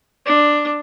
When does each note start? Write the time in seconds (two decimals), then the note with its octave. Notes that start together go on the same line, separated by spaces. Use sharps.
0.26 D4